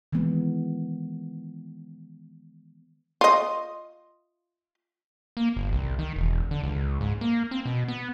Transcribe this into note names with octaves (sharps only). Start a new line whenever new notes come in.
D#3 E3 G#3 B3
F4 D#5
A#3
G1
C2
D#3
E1
D3
C#2
G#2
A#3
C4
B2
B3